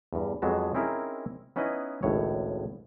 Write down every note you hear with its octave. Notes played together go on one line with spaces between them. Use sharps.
E2 G2
F2 F#3 G#3 B3 A5
C4 C#4 D#4 E4 G#4 A#4
B3 C#4 D#4 E4 B4 D#5
G#1 C#2 A2 C#5